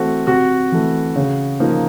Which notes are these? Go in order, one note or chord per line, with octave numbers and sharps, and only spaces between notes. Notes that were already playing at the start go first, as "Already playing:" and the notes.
Already playing: E3 A3 C4 F#4
C3 F#4
E3 A3
C#3
F3 A#3 D#4